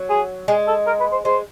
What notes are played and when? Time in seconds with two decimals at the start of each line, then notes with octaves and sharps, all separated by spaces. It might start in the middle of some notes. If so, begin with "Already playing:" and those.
Already playing: F#3
0.10 G#4
0.48 G#3 G#4
0.67 A4
0.87 A#4
1.00 B4
1.12 C5
1.25 G#3 C5